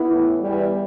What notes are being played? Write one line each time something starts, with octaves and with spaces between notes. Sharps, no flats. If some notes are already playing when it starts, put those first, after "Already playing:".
Already playing: B3 E4
A2 E3
E2 E3 G3